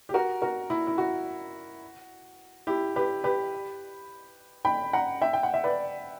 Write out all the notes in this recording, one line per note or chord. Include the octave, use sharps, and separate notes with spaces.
G4
F#4 A#4
F#4 A#4
E4
E4
F#4
E4 G4
G4 B4
G4 B4
G5 B5
F#5 A#5
E5 G5
G5
F#5
E5
B4 D5